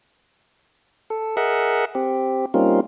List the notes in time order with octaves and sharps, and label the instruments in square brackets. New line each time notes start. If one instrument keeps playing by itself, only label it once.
[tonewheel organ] A4
G#4 A#4 D#5 E5 F#5
C4 G4
G3 A#3 C4 C#4 D#4 F4